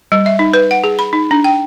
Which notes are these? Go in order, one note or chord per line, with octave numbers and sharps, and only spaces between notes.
G3
E5
D#4
B4
F#5
G#4
B5
D#4
D4
G5